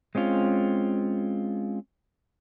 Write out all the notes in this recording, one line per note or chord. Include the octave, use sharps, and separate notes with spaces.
G#3 C4 C#4 F4